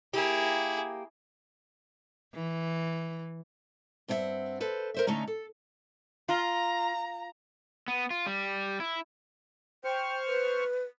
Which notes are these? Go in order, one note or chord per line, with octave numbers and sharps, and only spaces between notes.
A#3 E4 G4 G#4
E3
G2 C4 E4 F4 E5 F#5
A4 B4 C5
A#4 C5 E5
D3 A3 C#4 D#4 A#5
A4
F4 A#5
B3
F4
G3
E4
C5 G5 C#6 F6
B4